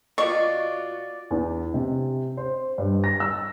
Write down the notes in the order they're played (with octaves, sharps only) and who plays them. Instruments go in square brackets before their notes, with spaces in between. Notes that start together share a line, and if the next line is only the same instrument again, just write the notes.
[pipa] B2 C#6 [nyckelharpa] F4 F#4 [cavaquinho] D5 [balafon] D#5
[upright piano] E2
C3
C5
G2
A#6
E6